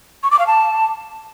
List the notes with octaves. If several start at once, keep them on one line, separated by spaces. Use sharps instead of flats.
C#6
D6
F5
A5